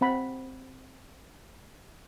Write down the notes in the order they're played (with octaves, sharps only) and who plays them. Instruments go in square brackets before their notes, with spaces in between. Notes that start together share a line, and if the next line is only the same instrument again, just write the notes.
[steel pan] C4 F#5 B5